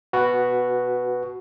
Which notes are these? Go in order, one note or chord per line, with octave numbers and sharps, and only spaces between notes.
F#4 B4